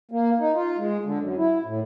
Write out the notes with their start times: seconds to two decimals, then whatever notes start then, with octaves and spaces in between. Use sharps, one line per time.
0.11 A#3
0.39 D#4
0.55 F4
0.78 G#3
1.05 D3
1.19 F#2
1.37 E4
1.65 A2